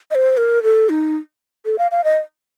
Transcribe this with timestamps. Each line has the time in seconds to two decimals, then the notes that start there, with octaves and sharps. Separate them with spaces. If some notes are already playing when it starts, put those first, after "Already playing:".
0.11 D#5
0.15 C5
0.37 A#4
0.63 A4
0.89 D#4
1.65 A4
1.79 F5
1.91 F5
2.04 D#5